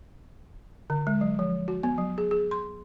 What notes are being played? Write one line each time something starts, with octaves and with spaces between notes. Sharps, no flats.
D3
G#3
F#3
F3
F#4
B3
F#3
G#4
G#4
C6